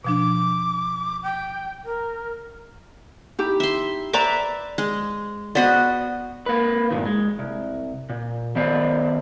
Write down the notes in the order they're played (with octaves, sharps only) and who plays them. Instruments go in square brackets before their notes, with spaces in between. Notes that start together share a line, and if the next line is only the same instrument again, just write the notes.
[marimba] B2 F3 D4 [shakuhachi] D6
[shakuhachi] G5
A#4
[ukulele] D#4 E4 G4
[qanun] E5 C6
[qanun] B4 E5 D6 [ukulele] C5 D5 A#5
[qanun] G#3
[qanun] B3 F#4 D#5 [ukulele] C5 D5
[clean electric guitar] A#3 B4
G2 A#2 D#3
G#3
C2
A#2
D#3 B3 C5 D5